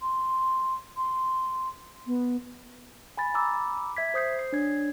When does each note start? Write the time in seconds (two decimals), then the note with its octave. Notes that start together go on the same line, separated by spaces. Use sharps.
0.02 C6
0.97 C6
2.07 B3
3.17 G#5 B5 A6
3.34 A#5 B5 D6 E6
3.97 E5 G#6 B6
4.14 C5 D#6 G6 C7
4.39 C7
4.53 D4 C#5 G#6